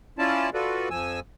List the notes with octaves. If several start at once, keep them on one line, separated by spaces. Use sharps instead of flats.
C#4 E4 F4 D5 A5
F4 F#4 A4 B4 D5
F2 F3 G#5 E6